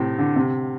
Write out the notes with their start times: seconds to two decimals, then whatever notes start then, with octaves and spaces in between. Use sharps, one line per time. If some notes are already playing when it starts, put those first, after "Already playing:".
Already playing: A2 C3
0.19 D3
0.36 C3